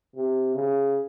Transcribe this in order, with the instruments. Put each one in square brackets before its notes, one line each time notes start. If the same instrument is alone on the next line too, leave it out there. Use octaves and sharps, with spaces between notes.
[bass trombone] C3
C#3